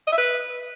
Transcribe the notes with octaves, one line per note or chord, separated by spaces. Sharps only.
D#5
E5
B4